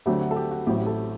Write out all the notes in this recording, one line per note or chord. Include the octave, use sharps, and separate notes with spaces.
D2 D3 F#3 A3 C4 G4
F#4
A4
G4
F#4
A1 A2 F#3 C4 G4
A4